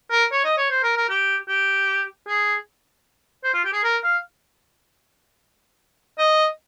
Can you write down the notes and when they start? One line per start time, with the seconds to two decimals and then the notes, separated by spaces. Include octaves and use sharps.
0.11 A#4
0.32 C#5
0.44 D#5
0.57 C#5
0.70 C5
0.83 A#4
0.97 A#4
1.09 G4
1.49 G4
2.27 G#4
3.44 C5
3.54 F4
3.64 G4
3.73 G#4
3.84 A#4
4.04 F5
6.18 D#5